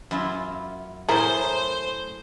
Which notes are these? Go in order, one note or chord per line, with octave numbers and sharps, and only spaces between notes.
F#2 E4 F4
A2 E4 G#4 A#4 C5